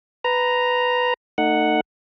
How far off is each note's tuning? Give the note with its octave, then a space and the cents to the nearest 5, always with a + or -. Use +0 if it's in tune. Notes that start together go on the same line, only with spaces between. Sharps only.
B4 +10 A#5 +0
A3 +25 D#4 -20 F#5 +0